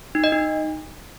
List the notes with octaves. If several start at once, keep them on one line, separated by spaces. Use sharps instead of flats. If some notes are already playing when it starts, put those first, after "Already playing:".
D#4
D#5
D#4